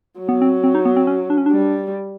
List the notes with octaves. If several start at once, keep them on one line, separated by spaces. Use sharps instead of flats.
F#3
B3
C4
C4
D#4
B3
C4
C#4
D4
C#4
D4
G3